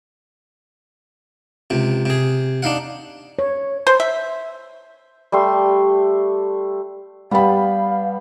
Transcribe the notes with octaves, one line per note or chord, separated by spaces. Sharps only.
C#2 C3
C3 G#4
D4 D#4 F5 F#5
C#5
C5
E5
G3 A3 C6
G3 B3 F5 G5 A5 B5